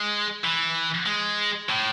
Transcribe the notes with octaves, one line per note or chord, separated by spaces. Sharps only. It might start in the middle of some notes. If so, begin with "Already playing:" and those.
Already playing: G#3
E3
G#3
A2